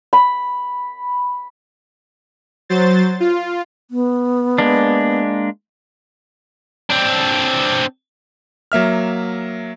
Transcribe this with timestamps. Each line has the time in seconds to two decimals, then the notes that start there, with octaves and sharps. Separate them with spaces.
0.13 B5
2.69 F#3 C5 A6
3.20 F4
3.91 B3
4.58 G#3 A#3 D4
6.90 C4 D4
8.72 F#3 A#3 E5 F6